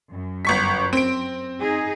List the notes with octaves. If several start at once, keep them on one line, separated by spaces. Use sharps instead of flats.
F#2
G1 C#6 B6
C4 D7
D#4 G#4